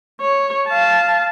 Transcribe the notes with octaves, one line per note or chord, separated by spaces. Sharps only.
C#5
F5 A5